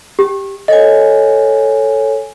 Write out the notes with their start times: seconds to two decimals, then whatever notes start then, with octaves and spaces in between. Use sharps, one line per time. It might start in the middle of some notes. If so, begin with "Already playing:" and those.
0.19 G4
0.68 A4 C#5 D#5 G#5